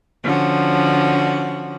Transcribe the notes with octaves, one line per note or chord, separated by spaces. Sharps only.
D3 F3 C#4 F#4